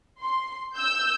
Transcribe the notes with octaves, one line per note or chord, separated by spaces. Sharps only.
C6
E6 G6